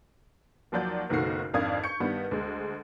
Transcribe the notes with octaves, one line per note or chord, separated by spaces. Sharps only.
D#2 F3 F#3 D5 G6
F#1 B1 D#3 A3 F#4 C7
G#1 F2 D4 F5 D#6 G#6
C#6 G6 C#7
G2 D#3 G3 B3
D2 G#3